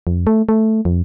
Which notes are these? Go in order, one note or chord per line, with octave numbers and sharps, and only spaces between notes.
F2
A3
A3
F2